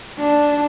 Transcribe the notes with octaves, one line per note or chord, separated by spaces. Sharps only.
D4